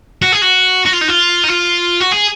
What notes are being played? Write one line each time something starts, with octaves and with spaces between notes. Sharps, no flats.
F#4
G#4
F#4
F#4
F4
D#4
F4
D#4
F4
F#4
G#4